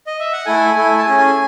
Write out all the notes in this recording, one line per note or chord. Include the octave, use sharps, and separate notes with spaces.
D#5
E5
F#5
A3 E4 A4 G#5
A3 E4 A4
A5
C#4 G#4 G#5